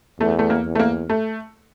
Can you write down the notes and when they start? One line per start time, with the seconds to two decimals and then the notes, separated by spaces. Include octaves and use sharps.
0.20 E2 A3
0.39 A3
0.50 A#3
0.65 E2
0.75 A3
0.79 A#3
1.10 A3